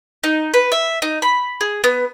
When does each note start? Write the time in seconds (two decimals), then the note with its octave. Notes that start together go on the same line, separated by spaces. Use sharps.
0.24 D#4
0.54 B4
0.72 E5
1.02 D#4
1.22 B5
1.61 G#4
1.84 B3